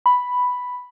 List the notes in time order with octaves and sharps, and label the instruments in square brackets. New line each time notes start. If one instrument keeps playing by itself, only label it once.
[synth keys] B5